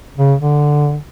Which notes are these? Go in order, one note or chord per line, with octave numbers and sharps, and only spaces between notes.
C#3
D3